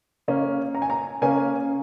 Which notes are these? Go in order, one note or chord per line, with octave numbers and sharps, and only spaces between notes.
C#3 A#3 C#4
A#5
G#5
A#5
C#3 A#3 C#4 G#5